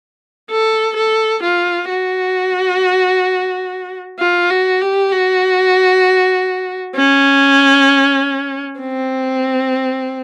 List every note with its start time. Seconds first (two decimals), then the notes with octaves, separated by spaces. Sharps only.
0.51 A4
0.97 A4
1.43 F4
1.89 F#4
4.19 F4
4.50 F#4
4.81 G4
5.12 F#4
6.96 C#4
8.80 C4